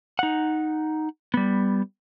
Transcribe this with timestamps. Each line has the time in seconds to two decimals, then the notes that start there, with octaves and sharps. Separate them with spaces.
0.19 D#4 F#5
1.34 G3 B3